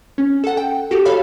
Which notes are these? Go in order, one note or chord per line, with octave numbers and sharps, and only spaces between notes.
C#4
A4 F#5
G5
F#4 G4 A4
A4 C#5 F5 B5